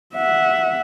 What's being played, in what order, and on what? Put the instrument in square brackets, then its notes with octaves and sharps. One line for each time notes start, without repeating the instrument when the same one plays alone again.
[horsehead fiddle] E5 F#5